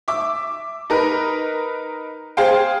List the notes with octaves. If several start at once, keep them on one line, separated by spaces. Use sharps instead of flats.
E5 D6
D#4 A#4 B4
G#4 C5 F5 G5